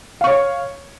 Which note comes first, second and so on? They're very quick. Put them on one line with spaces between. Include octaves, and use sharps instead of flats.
F5 C#6 C#5